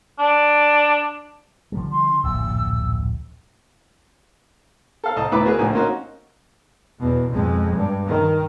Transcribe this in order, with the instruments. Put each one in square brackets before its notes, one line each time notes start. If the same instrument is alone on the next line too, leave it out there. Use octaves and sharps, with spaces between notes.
[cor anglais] D4
[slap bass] D3 F3 G3
[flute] C6
[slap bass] D1 A#1 F#2 [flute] E6
[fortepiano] A4 F5
C2 D#5 A5
D2 A2 E3 B4 B5 D6
B3 F#4 G#4 A#4 B4
A#1 A2 D3 G#5
A#3 C4 C#4 D#4 F#4
[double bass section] E2 B2
F2 G#3
G2
D#3